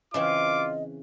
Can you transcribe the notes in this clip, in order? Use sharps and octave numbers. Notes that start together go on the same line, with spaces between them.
C#3 E3 C4 F4 D#5 D6